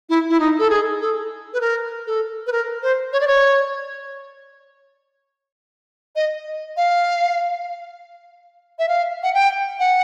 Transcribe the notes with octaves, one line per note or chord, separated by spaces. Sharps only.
E4
E4
D#4
A4
G#4
A4
B4
A#4
A4
B4
A#4
C5
C#5
D5
C#5
D#5
F5
E5
F5
F#5
G5
F#5